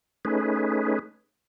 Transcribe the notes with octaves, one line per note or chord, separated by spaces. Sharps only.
A3 C#4 D#4 G#4 B4